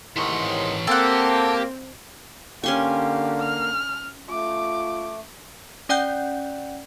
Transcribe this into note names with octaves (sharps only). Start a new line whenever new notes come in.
G#2 C3 D#3 E3 C#5 C6
A#3 C4 G4 A4 F#5
D3 A#3 C#4 G4 F5 C6 C#6
F6
A3 F4 D6
C#4 D5 F#5 G5 F#6 G6